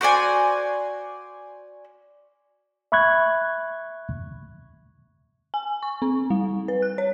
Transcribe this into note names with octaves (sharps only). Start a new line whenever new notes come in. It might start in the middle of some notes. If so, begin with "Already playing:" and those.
F#4 C5 D5 G#5
E5 B5 C#6 F#6 G#6
G#5
C#6
C4
G3
B4
F#6
C#5